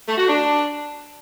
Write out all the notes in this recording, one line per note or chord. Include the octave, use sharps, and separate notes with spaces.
A3
F#4
D4